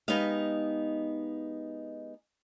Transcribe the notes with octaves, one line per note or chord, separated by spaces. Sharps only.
G#3 B3 D#4 G4 D#5 F5